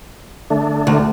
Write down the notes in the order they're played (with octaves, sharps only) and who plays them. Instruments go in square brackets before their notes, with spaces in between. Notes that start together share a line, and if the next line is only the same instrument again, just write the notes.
[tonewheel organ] D3 A3 D4
[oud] D2